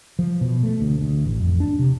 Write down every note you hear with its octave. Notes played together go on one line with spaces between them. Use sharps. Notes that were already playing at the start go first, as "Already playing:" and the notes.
F3
B2
A3
D2
D2
A1
F2
D4
C3